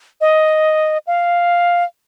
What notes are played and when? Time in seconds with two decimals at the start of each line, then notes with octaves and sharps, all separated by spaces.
0.21 D#5
1.07 F5